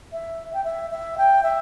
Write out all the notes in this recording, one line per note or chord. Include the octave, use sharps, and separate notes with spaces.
E5
G5
E5
E5
G5
E5